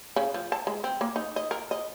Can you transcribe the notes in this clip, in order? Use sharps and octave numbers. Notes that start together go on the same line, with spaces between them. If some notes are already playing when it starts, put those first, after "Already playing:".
C#3
F3
A5
G#3
C4
A#3
D#4
D#5
A#4
D#5